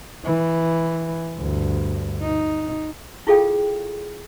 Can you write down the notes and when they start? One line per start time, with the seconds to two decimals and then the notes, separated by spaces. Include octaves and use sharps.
0.25 E3
1.37 D2 G2
2.22 D#4
3.27 E4 F4 G#4 A4 F5 G5